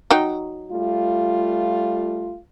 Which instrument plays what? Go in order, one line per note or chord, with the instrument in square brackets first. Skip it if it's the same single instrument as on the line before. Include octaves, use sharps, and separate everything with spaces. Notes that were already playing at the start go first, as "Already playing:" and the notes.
[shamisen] F#3 D#4 G5
[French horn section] G3 A3 F4